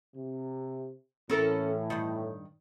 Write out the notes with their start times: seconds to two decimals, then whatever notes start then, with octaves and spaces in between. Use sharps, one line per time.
0.16 C3
1.30 A2 E3 C#4 A4 A#4
1.90 G2 D#3